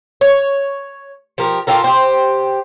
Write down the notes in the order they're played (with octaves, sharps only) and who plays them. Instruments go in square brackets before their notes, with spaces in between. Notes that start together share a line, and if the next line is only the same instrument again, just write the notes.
[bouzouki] C#5
F3 G4 A#4
F4 G4 A4 A#4
G4 C5